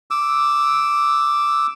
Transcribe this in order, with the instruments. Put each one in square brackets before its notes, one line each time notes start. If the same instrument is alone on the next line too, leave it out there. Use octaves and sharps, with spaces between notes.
[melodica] D6 E6